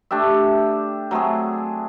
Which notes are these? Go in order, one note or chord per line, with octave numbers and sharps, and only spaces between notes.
A3 D4 G4 E5
F#3 A3 C4 G#4